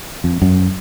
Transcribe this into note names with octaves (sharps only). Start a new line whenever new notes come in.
F2
F#2